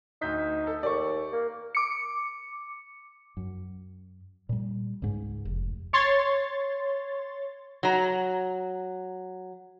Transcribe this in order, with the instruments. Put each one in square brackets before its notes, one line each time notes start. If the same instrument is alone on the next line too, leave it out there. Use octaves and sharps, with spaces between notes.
[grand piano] D2 G6 B6 [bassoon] D#4
[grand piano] A4
[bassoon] D#2 [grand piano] D5 C#6
[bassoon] A#3
[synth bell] D6 C#7
[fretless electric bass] F#2
A#2 G3
C#2 G#2
F1
[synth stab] C#5 C6 A6
[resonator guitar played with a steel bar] F#3 A#5